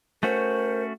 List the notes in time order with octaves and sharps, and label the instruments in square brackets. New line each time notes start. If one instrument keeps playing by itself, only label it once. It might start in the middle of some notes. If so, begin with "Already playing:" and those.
[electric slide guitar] A3 C#4 F#4 [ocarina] A#4 [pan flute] C5